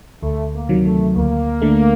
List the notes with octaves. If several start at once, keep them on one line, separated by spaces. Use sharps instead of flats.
D2 A3
A#3
C3 D#3 F#3
A3
D2 A#3
D3 A3